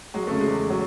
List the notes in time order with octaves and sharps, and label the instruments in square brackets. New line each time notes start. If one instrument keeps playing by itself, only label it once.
[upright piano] F#3 G#3
C#3 A3
G#3
E2
F#3